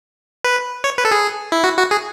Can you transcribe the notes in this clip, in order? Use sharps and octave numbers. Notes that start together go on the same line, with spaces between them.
B4
C#5
B4
A4
G#4
E4
F#4
F#4
G#4